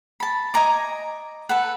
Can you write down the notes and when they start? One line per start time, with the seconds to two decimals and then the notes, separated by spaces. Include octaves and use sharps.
0.20 A5 B5
0.54 D#5 G#5 A#5 D6
1.49 A4 B4 F#5